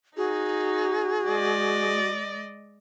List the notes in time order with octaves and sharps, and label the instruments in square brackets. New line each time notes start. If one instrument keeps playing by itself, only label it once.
[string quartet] D#4 [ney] F#4 [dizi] G#4
[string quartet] G#3 D5 D#5